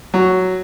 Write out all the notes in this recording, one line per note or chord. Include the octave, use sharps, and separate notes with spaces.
F#3